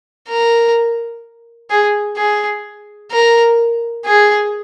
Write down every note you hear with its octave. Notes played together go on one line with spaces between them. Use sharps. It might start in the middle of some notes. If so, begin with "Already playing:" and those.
A#4
G#4
G#4
A#4
G#4